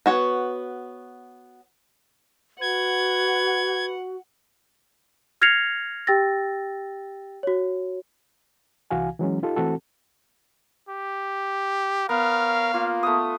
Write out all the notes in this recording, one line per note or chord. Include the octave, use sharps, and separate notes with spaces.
B3 F#4 C#5
F#4 B4 F#5 G#6
F6 G#6 A#6 C7 C#7 F7
G4 G5 E6 A6 A#6
F#4 C#5
C2 E3 F#4 F5 G#5
E3 F#3 G#3 C#4
D#4 F4 G4 A4
E3 A3 C4 F#4 A4
G4
B3 A#4 C#5 F5
A#3 F4
A3 B3 D#6